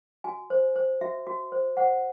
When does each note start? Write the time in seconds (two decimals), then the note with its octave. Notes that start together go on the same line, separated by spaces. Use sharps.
0.24 F#4 G#5
0.50 C5
0.76 C5
1.01 F#4 E5
1.27 F#4
1.52 C5
1.77 C5 F#5